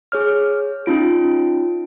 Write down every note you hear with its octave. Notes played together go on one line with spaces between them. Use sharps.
G#4 C#5 F6
C#4 D#4 F4 D7